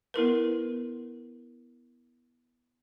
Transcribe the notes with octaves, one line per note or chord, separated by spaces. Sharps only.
B3 E4 A#4 B4